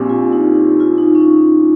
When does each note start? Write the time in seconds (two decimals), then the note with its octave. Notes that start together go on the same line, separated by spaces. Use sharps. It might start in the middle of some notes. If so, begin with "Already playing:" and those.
Already playing: A#1 A#2 C4 G4
0.10 F4
0.33 D#4
0.80 F4
0.98 D#4
1.15 C#4